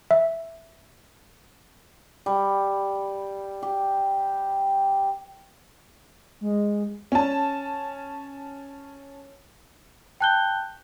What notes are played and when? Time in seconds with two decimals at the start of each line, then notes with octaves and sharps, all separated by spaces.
0.11 E5
2.26 G3
3.63 G4
6.41 G#3
7.12 C#4 A5
10.20 G5 A5 F#6 G6 G7